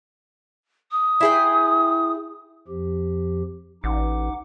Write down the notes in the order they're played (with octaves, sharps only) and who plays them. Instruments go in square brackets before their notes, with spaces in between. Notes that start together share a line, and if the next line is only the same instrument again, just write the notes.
[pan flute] D#6
[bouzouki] E4 G#4 G5
[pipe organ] F2 F3 G4
[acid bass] A1 [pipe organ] D#4 F#5 D6